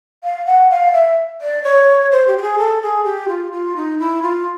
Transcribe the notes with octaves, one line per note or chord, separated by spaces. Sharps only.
F5
F#5
F5
E5
D5
C#5
C5
G4
G4
G#4
A4
G#4
G4
F4
F4
D#4
E4
F4